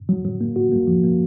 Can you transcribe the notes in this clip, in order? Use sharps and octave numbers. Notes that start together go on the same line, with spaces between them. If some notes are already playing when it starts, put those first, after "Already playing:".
F#3
F#3
A#3
F#4
A#3
F3
A#3